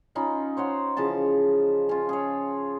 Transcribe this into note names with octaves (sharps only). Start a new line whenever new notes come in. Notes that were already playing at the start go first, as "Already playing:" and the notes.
C#4 D#4 F4 B5
C5 C#5 F#5 C6
C#3 E3 F3 A5
C#4 F4
G#4 C#5